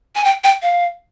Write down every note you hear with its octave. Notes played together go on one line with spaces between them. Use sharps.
G#5
G5
G5
F5